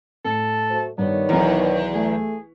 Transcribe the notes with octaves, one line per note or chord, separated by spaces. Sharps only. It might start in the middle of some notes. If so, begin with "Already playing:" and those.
A2 A4
F#3 A3 C5
G2 D#3 B3 C#5 D5
B1 E2 E3
A3 G#4